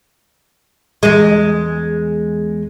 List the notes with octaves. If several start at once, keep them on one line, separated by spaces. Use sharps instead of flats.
E2 G#3